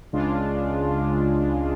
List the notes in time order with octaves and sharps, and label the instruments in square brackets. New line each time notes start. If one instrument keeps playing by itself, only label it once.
[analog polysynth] C#2 C#3 G#3 D4 F4